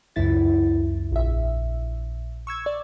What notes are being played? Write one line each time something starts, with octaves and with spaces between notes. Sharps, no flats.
C#2 F#2 E4 A6
A#1 E5
C#6 E6 G#6
D5